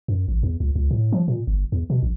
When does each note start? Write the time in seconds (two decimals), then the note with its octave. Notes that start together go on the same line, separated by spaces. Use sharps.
0.08 F#2
0.28 A1
0.43 E2
0.60 C#2
0.76 C#2
0.91 A2
1.12 F3
1.28 A#2
1.47 G1
1.72 E2
1.90 B2
2.03 A#1